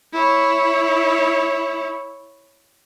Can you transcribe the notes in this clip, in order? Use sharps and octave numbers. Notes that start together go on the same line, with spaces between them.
E4 C#5